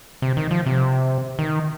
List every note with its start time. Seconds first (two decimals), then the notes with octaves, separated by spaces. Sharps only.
0.22 C3
0.37 D#3
0.51 F3
0.66 C3
1.39 D#3